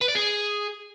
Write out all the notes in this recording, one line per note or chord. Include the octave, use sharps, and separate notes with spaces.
B4
D5
G#4